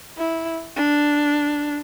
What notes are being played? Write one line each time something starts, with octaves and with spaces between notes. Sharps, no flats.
E4
D4